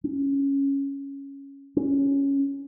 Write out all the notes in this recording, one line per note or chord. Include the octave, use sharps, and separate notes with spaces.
C#4
C#4